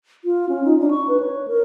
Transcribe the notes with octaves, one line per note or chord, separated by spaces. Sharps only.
F4
C#4
D#4
D4
C#6
B4
C#5
A#4